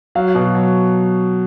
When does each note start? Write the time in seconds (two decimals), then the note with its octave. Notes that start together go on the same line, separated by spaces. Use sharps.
0.15 F#3 F5
0.35 B2
0.55 F#3